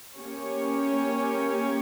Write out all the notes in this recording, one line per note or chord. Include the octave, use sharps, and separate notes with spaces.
A#3 C#4 G4 C#5